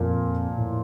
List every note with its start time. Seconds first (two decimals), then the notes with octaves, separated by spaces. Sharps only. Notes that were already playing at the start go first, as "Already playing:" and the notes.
Already playing: F2 A#2 F3 A#3
0.58 A2